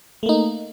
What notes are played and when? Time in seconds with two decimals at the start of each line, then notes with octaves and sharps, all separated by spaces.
0.23 A3
0.26 A#3
0.29 D#4